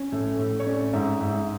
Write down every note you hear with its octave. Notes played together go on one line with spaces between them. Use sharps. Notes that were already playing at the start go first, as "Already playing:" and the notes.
Already playing: C#4
A2
A2
C#5
C#4 D5
G#2 E5
G#2 E5